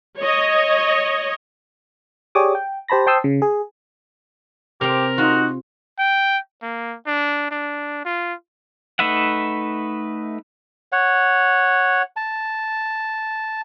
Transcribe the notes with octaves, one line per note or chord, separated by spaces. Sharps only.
C#5 D#5
G4 G#4 C#5 D5 D6 D#6
G5
G4 C5 A5 B5 A#6
C5 G5 A5 C6 D#6 E6
C#3
G#4
C3 C4 G4 A#4
D#4 F4 F#4
G5
A#3
D4
D4
F4
A3 D#4 B4 E5 F#5
C#5 F#5
A5